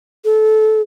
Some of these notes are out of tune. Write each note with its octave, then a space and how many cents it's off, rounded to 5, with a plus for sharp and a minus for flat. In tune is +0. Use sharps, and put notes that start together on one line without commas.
A4 -20